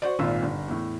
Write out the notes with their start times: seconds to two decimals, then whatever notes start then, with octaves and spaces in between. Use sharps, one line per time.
0.02 F#4 C5 D5
0.19 G#1 A#2 F4 E6
0.43 G1
0.68 E2 A2